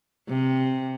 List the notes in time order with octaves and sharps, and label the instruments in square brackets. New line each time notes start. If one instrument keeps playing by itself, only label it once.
[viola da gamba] C3